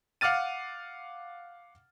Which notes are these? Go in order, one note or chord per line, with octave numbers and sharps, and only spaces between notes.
F5 F#5 D6 F6 A6 D#7